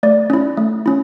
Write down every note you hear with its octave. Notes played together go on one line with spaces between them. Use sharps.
A3 D5
C#4 E4
A3
C#4 E4